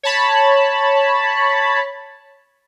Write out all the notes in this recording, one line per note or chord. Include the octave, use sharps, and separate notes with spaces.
C#5 A5 B5